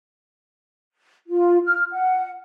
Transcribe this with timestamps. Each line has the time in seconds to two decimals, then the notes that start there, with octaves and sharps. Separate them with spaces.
1.28 F4
1.65 F6
1.93 F#5